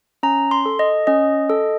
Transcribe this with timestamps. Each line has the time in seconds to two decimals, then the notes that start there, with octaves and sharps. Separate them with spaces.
0.23 C#4 A#5
0.51 C6
0.66 A4
0.79 D#5
1.07 C#4 D#5
1.50 A4